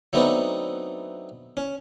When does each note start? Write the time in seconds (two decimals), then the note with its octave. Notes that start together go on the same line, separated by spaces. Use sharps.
0.13 F#3 A3 B3 C4 D4 D#4
1.57 C#4